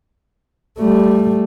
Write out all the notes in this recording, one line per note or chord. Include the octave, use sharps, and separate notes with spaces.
G3 A3